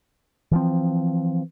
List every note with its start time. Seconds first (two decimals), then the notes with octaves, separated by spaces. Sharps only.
0.51 E3 F3 C4